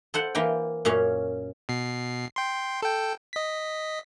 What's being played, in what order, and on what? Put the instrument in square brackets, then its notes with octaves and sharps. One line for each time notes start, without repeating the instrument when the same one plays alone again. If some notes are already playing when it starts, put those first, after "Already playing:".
[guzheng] A4 C5 F#5
E3 A#3 F5 G5
F#2 A#2 C#4 F5
[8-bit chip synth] B2 C7
G5 C6
A4 G5
D#5 B6